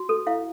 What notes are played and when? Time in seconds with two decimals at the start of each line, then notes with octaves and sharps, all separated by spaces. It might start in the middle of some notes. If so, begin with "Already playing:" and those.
Already playing: F#4
0.09 A4
0.27 E4 F5